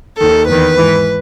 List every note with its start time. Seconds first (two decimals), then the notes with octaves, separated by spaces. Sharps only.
0.20 D#2 D#3 A4
0.48 E2 D#3 B4
0.77 G#2 E3